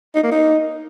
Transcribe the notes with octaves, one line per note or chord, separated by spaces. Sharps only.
D#4
A#3
D#4